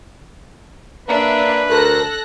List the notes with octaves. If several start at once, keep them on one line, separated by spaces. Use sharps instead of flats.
A#3 D4 B4 E5
D2 A4 A#4 F#6 A#6